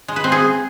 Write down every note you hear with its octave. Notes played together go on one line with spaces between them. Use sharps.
G#3
B4
C4
G#4